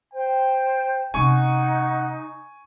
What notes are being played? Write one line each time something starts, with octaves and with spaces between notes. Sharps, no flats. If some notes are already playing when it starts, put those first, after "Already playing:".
C5 G5
C3 C#4 D#4 F#5 G#5 C#6